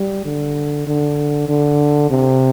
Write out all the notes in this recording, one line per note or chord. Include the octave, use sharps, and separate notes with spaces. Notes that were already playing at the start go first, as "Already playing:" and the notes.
Already playing: G3
D3
D3
D3
C3